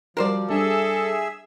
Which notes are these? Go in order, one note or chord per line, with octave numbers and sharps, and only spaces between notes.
F3 G3 F#4 A#4 C5 D5
G3 D4 G#4 A4 E5